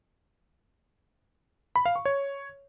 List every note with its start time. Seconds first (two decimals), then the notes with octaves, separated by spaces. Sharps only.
1.76 B5
1.86 F5
1.95 C#6
2.05 C#5